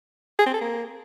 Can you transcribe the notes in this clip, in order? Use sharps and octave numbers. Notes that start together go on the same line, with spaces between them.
G#4
C4
A4
A#3